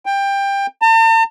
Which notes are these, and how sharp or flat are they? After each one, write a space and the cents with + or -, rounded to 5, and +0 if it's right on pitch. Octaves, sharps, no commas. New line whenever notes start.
G5 +20
A5 +45